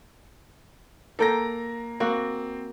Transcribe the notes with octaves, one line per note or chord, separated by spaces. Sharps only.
A#3 A4 G5 A#5 A#6
A#3 C4 F#4